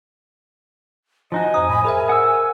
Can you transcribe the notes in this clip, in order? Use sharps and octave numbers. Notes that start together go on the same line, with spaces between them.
F3 D#4 F#4 D#5 G#5
F2 C5 A#5 D#6
A2 B5
G#4 A#4 C5 E5
F#5 E6